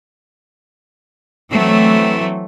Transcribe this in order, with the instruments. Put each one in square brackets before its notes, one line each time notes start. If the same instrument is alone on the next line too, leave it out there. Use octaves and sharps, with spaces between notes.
[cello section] E3 F#3 A3 C4